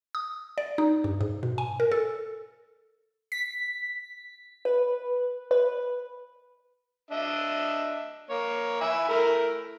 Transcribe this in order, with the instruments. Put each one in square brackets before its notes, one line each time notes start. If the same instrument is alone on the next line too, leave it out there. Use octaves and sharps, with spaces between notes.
[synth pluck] D#6
D5
D#4
G2
G#2
B2
G#5
A#4
A4
B6
B4
B4
[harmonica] D4 D#5 E5
A#3 C#5
E5 G#5 B5
A3 E4 A#4